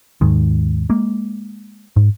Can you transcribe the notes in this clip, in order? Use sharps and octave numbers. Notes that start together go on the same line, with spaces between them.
D#2 G#2 D#3
G#3 A#3
G#2